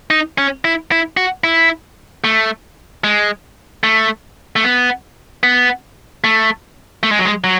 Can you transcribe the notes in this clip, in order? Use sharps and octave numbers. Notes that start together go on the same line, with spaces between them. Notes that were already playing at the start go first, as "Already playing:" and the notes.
D#4
C#4
E4
E4
F#4
E4
A3
G#3
A3
A3
B3
B3
A3
A3
G#3
F#3
G#3
F#3